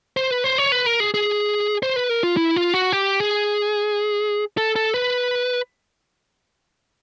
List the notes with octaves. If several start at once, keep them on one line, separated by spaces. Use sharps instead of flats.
C5
B4
C5
C#5
B4
A#4
G#4
G#4
C5
B4
A#4
F4
E4
F4
F#4
G4
G#4
A4
A4
B4